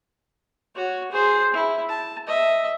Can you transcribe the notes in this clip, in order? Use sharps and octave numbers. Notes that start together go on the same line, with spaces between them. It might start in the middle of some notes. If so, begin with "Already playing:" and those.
F#4 C#5
G#4 C5
E4
A5
D#5 E5